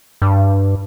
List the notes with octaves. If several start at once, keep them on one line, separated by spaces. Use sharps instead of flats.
G2